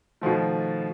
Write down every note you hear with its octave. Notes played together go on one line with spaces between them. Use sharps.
B2 D#3 F3 A3